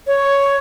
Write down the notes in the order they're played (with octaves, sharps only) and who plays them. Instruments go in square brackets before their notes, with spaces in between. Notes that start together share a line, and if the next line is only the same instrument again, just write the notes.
[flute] C#5